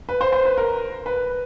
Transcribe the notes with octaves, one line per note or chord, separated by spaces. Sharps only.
B4
C5
C5
B4
A#4
B4